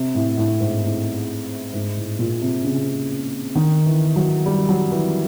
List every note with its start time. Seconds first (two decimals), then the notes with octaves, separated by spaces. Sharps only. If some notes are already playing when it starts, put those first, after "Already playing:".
Already playing: C3
0.15 A2
0.38 A2
0.60 G#2
0.84 A2
1.74 G#2
1.97 A2
2.19 A#2
2.42 C3
2.65 C#3
3.55 D#3
3.86 E3
4.16 F#3
4.46 G3
4.69 F#3
4.92 E3